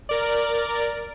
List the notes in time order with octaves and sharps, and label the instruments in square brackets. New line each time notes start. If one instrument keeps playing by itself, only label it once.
[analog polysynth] A#4 D5